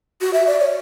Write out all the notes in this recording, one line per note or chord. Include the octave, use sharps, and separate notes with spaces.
F#4
E5
D5
C#5